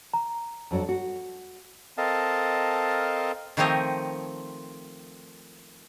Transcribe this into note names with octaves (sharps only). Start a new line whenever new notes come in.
A#5
F2 F#3 D4
F#4
C4 A4 A#4 D#5 F5 A5
D#3 F3 A3 C4 C#5 D#5